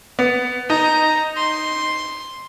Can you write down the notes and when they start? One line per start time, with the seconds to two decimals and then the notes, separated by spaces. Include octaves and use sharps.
0.19 B3
0.70 D#4 A#5
1.37 C6